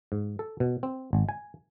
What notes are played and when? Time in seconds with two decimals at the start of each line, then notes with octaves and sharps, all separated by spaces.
0.12 G#2
0.39 A4
0.60 B2
0.83 C4
1.13 G#1
1.29 G#5